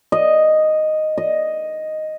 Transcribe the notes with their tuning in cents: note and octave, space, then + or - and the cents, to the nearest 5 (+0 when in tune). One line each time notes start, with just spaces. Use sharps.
D#5 -5
D#5 +0